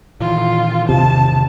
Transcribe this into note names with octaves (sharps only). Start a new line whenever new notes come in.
A#2 D#3 E3 F4
A1 E2 C3 D#3 A5